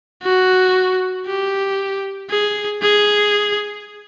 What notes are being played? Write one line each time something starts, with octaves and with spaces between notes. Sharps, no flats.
F#4
G4
G#4
G#4